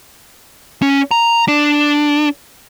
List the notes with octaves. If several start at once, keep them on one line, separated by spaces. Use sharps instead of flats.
C#4
A#5
D4